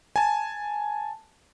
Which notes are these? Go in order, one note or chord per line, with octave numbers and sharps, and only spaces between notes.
G#5 A5